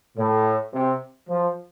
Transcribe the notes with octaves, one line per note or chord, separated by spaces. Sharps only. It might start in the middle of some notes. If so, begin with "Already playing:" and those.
A2
C3
F3